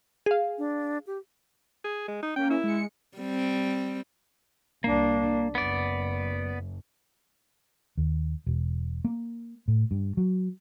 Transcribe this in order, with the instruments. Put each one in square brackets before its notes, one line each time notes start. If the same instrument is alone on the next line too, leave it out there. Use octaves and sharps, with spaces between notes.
[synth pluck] G#4 F5
[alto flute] D4
G4
[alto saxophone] G#4
G#3
D#4
[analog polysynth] A#3 C#4 [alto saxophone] G5
[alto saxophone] E4
[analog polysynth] G#3 C#7
[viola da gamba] G3 C4
[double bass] C2 D4 [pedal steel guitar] A#3
[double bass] F#1 [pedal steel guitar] B3 D5
[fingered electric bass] D#2
E1
A#3
A2
G2
F#3